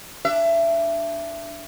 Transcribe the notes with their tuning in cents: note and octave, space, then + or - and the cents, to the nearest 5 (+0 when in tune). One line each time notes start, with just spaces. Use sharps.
D4 +0 E5 +25